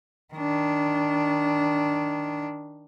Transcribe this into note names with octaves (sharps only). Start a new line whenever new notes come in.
D#3 D4